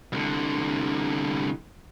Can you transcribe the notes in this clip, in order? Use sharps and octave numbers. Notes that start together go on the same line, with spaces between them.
C2 D3